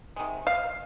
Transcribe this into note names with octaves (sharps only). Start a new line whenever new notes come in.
C3 D#3 G#3
F5